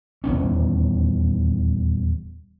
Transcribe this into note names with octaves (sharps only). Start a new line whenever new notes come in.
D#1 G#1 E2 C#4